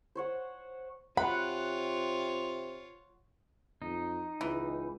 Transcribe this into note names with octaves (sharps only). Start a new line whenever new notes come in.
C5 C#5 F#5
C3 F4 C#5 F#5 B5
F2 D#4
C#2 E3